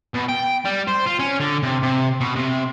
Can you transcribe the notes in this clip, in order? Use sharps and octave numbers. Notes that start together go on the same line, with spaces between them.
B2
G5
G3
C5
F4
C#4
D3
C3
C3
B2
C3